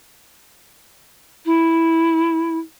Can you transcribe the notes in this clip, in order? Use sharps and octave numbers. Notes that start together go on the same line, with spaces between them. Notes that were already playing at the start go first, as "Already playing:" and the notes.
E4